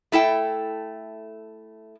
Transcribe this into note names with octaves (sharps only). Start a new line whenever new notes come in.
A3 E4 A4 G5